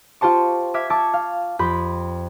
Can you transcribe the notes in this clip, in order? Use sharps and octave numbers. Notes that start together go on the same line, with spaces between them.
F4 G4 C5 A5 C#6
E5 D6 F6 G#6 B6
A5 C#6 D6 E6 G#6
F5
F2 G4 B5 C6 G6